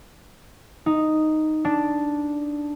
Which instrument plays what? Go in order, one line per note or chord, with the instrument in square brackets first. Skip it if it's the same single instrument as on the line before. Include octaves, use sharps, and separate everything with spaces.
[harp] D#4
D4